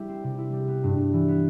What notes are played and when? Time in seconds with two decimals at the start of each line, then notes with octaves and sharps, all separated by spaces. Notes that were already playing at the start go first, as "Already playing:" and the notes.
Already playing: G3 E4
0.08 C4
0.24 C3
0.38 E4
0.53 G3
0.68 B3
0.83 G2
0.98 G2
1.13 E3
1.28 B3